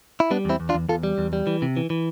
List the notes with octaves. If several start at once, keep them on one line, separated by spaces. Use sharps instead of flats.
E4
G3 B3 D4
E2 C4 E4
E2
D4 F4
E2
E2 F4 A4
G3
E2
G3
E3
C3
E3
E3